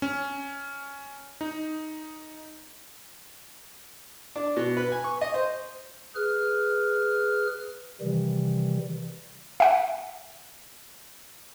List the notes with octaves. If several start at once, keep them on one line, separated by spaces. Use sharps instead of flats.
C#4
D#4
D4
B2
B4
G#5
C#6
D#5
C5
G#4 B4 F6
C3 D#3 E3 G3
E5 F#5